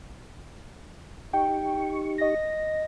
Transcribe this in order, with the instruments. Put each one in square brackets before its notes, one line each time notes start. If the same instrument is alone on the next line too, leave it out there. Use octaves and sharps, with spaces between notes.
[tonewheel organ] D#4 G4 C#6 [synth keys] G5
[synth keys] D#5 A#6